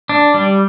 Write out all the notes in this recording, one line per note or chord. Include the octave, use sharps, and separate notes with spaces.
D4
G3